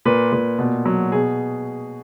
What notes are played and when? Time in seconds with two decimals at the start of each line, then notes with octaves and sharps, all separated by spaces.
0.05 A#2 B4
0.32 A#2
0.59 B2
0.86 F#3
1.12 B2 G#4